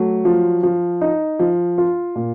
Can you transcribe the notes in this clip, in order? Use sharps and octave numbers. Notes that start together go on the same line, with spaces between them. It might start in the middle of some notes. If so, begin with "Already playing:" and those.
Already playing: F#3 A3
F3
F3
D#4
F3
F4
A#2